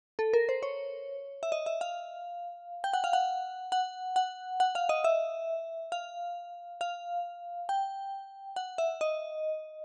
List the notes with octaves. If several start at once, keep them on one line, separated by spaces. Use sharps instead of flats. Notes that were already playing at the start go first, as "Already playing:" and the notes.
A4
A#4
C5
C#5
E5
D#5
E5
F5
G5
F#5
F5
F#5
F#5
F#5
F#5
F5
D#5
E5
F5
F5
G5
F#5
E5
D#5